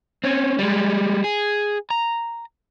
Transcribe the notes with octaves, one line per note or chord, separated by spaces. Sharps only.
C4 C#4
G3 G#3
G#4
A#5